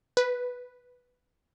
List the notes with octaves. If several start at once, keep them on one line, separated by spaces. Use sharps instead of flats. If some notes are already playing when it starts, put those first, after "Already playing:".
B4